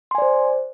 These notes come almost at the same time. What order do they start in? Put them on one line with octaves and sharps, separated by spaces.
C6 G#5 D5 C5